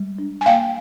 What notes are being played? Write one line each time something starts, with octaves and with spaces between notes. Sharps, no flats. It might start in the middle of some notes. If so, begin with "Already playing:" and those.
Already playing: G3 G#3
D4
G#5
A#3 F5 G5